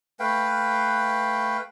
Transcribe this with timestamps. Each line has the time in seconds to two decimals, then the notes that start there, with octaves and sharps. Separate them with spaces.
0.20 A3 B4 F5 G5